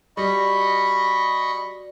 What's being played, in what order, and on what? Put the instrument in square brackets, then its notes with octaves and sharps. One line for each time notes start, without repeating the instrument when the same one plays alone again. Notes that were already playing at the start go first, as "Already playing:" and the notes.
[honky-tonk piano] G3 [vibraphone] F#4 D5 [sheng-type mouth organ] D#5 B5 C#6